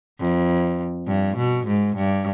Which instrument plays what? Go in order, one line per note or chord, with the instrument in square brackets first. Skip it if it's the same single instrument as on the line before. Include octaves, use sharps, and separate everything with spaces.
[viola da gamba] F2
G2
B2
G#2
G2